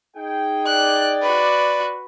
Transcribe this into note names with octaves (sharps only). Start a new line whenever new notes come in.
D#4 G#4 G5
D5 F#6
F#4 B4